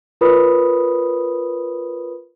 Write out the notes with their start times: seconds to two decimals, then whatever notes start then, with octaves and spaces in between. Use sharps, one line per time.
0.21 F4 A#4 B4 C#5 B5 D#6